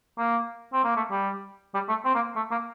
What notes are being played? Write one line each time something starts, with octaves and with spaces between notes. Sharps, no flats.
A#3
C4
A#3
A3
G3
G3
A3
C4
A#3
A3
A#3